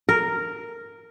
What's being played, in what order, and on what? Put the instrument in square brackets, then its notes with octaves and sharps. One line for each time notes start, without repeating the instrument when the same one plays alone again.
[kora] A#4